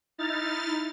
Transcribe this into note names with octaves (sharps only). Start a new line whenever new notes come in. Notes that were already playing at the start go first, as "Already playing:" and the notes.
D#4 E4 F6 A6